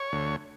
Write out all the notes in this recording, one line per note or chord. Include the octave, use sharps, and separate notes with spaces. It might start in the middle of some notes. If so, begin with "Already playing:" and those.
Already playing: C#5
D2